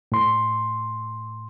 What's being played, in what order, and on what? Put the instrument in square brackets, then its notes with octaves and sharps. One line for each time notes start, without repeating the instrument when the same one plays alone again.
[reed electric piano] A2 C6